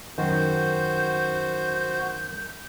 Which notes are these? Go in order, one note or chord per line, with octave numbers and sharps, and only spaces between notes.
F#2 D#3 F#4 C5 G6